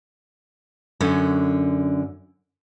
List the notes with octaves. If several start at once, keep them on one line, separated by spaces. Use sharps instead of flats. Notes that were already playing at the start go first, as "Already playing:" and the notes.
F#2 D3 C#4